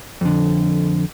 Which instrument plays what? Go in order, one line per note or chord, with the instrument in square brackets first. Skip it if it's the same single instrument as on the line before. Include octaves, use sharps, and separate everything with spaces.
[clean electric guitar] F2 D3